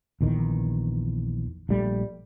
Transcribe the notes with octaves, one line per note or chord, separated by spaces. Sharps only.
A#1 E2 D#3
A#1 G3 A3